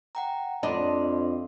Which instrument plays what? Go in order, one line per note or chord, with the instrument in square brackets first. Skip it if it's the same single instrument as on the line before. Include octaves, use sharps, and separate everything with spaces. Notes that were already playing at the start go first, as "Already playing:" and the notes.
[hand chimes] F#5 G5 A#5
[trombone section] F2 [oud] D4 [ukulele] D#5 [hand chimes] B5 C6